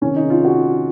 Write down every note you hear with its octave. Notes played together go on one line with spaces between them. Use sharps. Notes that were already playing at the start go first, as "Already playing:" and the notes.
C3 D#3 C#4
D#4
F4
F#4